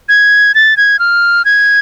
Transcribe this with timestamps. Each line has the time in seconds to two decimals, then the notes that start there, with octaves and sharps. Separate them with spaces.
0.09 G#6
0.55 A6
0.77 G#6
0.99 F6
1.45 G#6